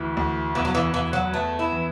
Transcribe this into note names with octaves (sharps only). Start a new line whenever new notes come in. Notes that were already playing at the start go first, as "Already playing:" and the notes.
Already playing: D2 E3
D2
E2 E3
F#3
E3
E2 E3
F#3
A3 B3
E4
E3